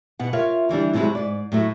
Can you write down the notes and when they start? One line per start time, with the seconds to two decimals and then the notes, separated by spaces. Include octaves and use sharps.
0.19 B2 F#5
0.33 F4 A#4 C#5 E5 F5
0.69 D3 E3 G3 D4
0.93 A2 C3 F#3 G#3 E4
1.15 G#2 D5
1.52 A2 F#3 A3